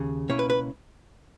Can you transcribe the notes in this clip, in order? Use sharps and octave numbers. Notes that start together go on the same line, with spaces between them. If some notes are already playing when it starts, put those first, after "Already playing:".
Already playing: D#2 C#3
C#2 B2 A#3 C#4 E4 C#5
B4
B4